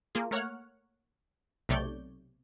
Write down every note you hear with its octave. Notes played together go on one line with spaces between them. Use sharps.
A#3 F4 G#4
A3 A#3 A#4 C#5 F#5 F6
B1 C3 A3 C#5 D5 G6